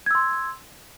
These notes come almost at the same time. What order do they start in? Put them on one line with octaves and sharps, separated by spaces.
G#6 E6 C6